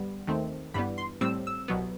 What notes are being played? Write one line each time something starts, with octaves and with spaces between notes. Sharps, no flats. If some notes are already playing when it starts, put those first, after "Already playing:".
Already playing: G1 G2 G3 B3
D#2 D#3 A3 C4
G1 G2 E3 G3 B3 B5
C6
A2 G3 C4 E6
E6
C2 B2 F#3 B3